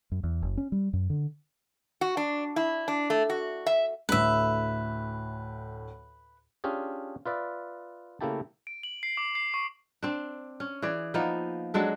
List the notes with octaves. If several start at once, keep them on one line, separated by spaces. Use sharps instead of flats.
F#2
E2
F#1
C#4
G3
F#2
D3
F#4
D4
E4
D4
A3
F#4
E5
D2 A2 B4 E5
C#4 D4 F4 G4 G#4
F4 B4 D5 E5
C#3 A3 A#3 E4 G4 A5
D7
F#7
C7
D6
C7
C#6
C4 D4
C#4
E3 G#4 D5
F3 A#3 B3 D#4
F#3 G#3 D4 A4